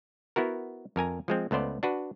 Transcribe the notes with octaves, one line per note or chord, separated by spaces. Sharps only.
B3 E4 F#4 A#4
F2 A#4 G#5 A#5
F3 G#3 C4
C#2 A3 B3 C5 D5
D4 F#4 B4